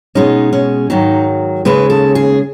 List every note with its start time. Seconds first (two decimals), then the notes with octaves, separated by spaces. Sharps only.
0.15 B2 G#3 C#4 D#4
0.53 C#4
0.90 G#2 D#3 F#3 D#4
1.65 D#2 C#3 G#3 C#4 B4
1.90 A4
2.15 G#4